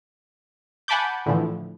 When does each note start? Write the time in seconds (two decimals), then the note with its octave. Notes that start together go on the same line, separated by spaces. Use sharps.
0.88 F#5 G#5 A5 B5 D6 G6
1.26 A2 D3 E3 F3